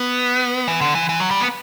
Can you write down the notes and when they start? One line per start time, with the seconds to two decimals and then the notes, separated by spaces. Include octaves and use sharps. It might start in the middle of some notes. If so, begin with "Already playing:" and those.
Already playing: B3
0.68 E3
0.81 D3
0.95 E3
1.09 E3
1.20 F#3
1.31 G3
1.40 B3